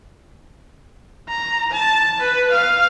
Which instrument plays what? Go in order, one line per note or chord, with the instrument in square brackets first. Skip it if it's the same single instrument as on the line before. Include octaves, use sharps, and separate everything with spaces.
[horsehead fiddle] A#5
A5
B4
F5